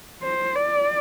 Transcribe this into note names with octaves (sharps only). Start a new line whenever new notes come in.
C5
D5